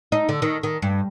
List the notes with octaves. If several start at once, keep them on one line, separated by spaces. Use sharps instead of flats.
D#4
D3
D#3
D#3
G2